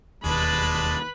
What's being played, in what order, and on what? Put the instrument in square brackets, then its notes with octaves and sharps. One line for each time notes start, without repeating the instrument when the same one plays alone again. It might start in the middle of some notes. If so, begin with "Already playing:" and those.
[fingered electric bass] E1 D#2 [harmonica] G#3 D5 A5 [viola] B4 B5